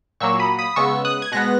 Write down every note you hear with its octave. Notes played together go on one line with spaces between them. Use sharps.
A#2 F#3 A#3 C#6 E6
B5 D#6
B5 D#6
C#3 G#3 B3 C#6 E6
D#6 F#6
G#6
B2 G#3 B3 F#6 A#6